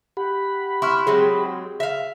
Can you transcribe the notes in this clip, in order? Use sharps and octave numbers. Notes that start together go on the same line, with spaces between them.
G4 F#5 B5
E4 C6 C#6 F6
F#3 G#3 C4 G#4
E5 F5